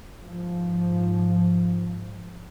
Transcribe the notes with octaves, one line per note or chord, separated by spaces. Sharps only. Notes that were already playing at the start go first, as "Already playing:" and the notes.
G#2 F3